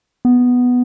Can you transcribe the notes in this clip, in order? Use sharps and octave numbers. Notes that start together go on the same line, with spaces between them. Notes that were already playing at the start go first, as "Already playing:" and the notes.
B3